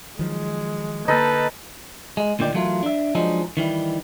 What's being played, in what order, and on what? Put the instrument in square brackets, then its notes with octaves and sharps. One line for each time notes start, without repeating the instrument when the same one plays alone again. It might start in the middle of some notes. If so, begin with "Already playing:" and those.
[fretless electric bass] D#3 F3 F#3 [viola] G#3
[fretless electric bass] D3 A#3 [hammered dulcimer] D#4 A4 [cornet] B4 [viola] A5
[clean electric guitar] G#3
D2 A#2 D#3 G4 D5
E3 F#3 A3 F4 A#4
D4 E5
F3 F#3 G#3 D4 D#4
D#3 E3 G3